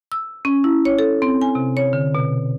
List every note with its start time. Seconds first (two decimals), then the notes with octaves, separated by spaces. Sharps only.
0.12 E6
0.45 C#4
0.64 E4
0.85 C#5
0.99 A4
1.22 C4
1.41 G#5
1.55 C3
1.77 C#5
1.93 D3
2.15 B2